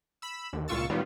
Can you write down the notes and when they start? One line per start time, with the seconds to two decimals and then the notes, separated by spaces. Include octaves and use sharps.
0.22 B5 E6
0.53 D#2
0.68 C#2 A#2 F4 C#6 E6 A6
0.90 A2 D#3 F#3 G3 B3 F4